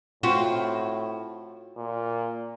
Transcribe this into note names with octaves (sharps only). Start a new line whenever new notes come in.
A2 C4 F4 F#4 C5
A#2